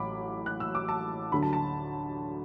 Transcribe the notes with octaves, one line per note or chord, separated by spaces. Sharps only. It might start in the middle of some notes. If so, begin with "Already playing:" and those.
Already playing: A1 A2 F#3 B5 D6
F#6
E6
D6
A5
D2 D3 F#3 B5
A5
A5